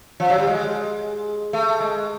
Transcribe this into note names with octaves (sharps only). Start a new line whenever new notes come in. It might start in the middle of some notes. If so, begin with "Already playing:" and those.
F3
F#3
G3
G#3
A3
G#3